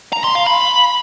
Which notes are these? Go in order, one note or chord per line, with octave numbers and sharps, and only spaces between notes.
A#5
C6
F5
B5